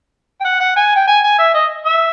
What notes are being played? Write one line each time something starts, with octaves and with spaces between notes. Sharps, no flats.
G5
F#5
F#5
G#5
G5
G#5
G#5
E5
D#5
E5